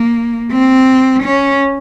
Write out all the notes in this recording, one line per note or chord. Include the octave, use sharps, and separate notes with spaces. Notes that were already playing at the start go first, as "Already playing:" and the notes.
Already playing: A#3
C4
C#4